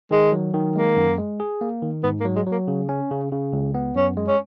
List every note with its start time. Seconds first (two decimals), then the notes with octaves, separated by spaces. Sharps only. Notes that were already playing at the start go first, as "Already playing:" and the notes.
0.11 D#3 G#3
0.32 F#3
0.54 D#3
0.76 G#3 A#3
0.97 F#2
1.18 G#3
1.40 G#4
1.61 A#3
1.82 D#3
2.03 G#2 B3
2.20 A#3
2.25 F#3
2.36 G#3
2.47 F#3 A#3
2.68 C#3
2.89 C#4
3.11 C#3
3.32 C#3
3.53 C#2
3.74 B3
3.96 F#2 C#4
4.17 G#3
4.28 C#4